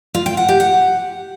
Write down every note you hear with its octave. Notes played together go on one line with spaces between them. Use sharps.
F4
G5
F#5
G4
F#5